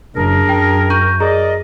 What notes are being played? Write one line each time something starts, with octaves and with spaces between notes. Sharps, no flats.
F#1 D4 G#4 A#4
F#2 G5
C#6 G6 D#7
G#4 A#4 D5 D#5 A#5